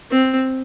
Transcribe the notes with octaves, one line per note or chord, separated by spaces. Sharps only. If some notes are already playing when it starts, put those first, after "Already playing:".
C4